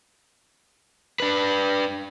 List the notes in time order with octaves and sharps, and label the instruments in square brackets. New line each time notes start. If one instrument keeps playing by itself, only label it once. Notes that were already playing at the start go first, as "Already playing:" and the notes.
[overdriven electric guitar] D4 B4